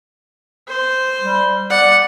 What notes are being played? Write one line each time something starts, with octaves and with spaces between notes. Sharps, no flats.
C5
G3
D5 F#5